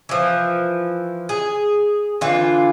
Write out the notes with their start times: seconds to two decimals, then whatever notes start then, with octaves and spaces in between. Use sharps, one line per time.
0.09 E3 F3
1.29 G#4
2.21 D3 E3 F4